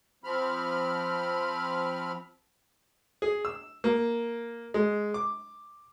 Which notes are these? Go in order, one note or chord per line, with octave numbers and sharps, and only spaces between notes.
F3 C4 B5 F6
G#4
E6
A#3
G#3
D6